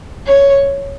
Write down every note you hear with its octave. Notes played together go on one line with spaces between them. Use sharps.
C#5